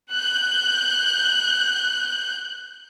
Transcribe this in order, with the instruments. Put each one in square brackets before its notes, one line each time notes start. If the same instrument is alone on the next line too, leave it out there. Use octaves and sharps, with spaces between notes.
[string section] F#6 G6